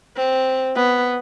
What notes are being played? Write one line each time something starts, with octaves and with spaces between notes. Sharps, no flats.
C4
B3